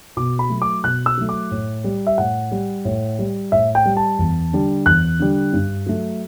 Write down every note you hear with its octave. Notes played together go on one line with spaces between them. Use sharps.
B2 D6
B5
F#3 A3
D6
B2 F#6
E6
F#3 A3
D6
A2
G3
E5
A2 F#5
G3
A2
G3
A2 E5
G5
G3
A5
E2
D3 G3
E2 F#6
D3 G3
G2
F#3 A3